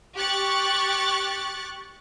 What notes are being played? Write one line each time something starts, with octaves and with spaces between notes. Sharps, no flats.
G4 C#6 F#6 A6